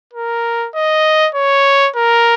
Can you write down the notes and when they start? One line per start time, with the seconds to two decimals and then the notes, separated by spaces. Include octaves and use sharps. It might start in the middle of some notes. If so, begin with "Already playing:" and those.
0.13 A#4
0.75 D#5
1.35 C#5
1.96 A#4